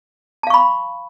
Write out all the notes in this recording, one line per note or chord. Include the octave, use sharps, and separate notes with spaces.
F5 A5 B5 C#6